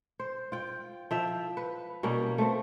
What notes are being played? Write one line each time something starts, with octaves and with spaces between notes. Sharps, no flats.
C5
F4 G5
F3 E5 G5
B4
B2 G3 A#3 C#4
A3 B3 C4